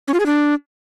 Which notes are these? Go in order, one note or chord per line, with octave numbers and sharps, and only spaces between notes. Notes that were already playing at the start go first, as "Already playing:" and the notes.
C#4
F4
G#4
D4